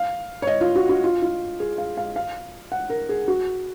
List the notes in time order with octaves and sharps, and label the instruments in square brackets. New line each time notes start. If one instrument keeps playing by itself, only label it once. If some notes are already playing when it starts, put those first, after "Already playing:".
Already playing: [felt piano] F5
C#5
D#5
F4
F#4
F#4
F4
F4
G#4
F5
F5
F5
F#5
A#4
G#4
F#4